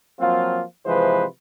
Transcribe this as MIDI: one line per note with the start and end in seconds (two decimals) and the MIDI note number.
0.19 0.63 53
0.19 0.63 54
0.19 0.63 58
0.19 0.63 60
0.19 0.63 65
0.86 1.25 48
0.86 1.25 52
0.86 1.25 53
0.86 1.25 56
0.86 1.25 71
0.86 1.25 72